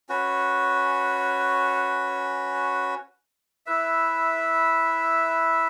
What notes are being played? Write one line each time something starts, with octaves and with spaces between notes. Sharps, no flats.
C#4 F#4 B4
E4 B4 E5